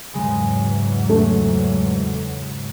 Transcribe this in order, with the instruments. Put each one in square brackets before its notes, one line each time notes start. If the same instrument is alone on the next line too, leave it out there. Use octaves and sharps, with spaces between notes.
[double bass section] E2 G#2 F#3 [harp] C#3 G#3
[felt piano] A3